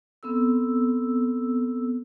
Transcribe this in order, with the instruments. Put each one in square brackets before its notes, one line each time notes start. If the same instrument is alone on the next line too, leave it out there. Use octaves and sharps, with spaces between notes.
[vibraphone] B3 C4 A4 E6